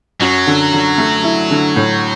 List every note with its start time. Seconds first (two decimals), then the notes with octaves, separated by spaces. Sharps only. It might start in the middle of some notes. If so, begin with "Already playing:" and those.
0.20 F#2 F#3
0.47 D3
0.73 D3
0.98 A3
1.24 E4
1.51 D3
1.76 A2